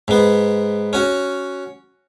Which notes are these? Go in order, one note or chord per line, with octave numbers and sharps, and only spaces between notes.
G#2 B3
C#4 F#4